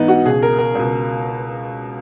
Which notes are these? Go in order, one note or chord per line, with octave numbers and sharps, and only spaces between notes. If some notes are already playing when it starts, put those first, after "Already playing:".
Already playing: G#2 E3 B3 D#4
F#4
C#2 B2 G#4
A#4
A#4
C#2 B2